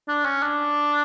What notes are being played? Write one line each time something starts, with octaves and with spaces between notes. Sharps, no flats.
D4
C#4
D4